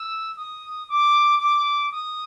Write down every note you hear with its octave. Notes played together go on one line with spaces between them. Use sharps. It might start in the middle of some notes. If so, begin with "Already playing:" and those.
Already playing: E6
D#6
D6
D6
D#6